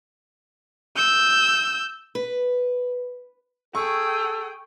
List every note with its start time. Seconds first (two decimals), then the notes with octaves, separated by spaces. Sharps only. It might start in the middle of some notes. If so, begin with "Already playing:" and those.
0.96 E6 G6
2.15 B4
3.75 G#4 A4 G5 C#6 E6